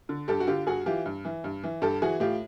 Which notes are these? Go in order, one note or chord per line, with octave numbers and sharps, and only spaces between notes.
D3
G2 G4 A4
F#4
D3 F4 G4
G2 F#4 G#4
E3 F4 G4
G2
E3
G2
E3
G2 G4 A4
E3 F#4 G#4
A2 F4 G4